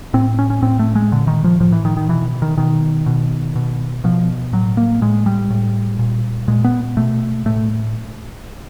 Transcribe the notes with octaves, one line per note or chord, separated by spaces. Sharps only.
A2 C4
C#4
C#4
A2 C4
A3
G#3
A#2 D3
D#3
F3
A2 F3
E3
D#3
D#3
B2 E3
D#3
B2 D#3
B2
B2
B2 F3
A2 F#3
A#3
A2 G#3
G3
A2
A#2
A#2 G#3
B3
B2 A3
A2 A3